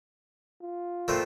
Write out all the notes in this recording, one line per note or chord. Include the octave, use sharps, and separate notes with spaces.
F4
A#2 F3 A3 C4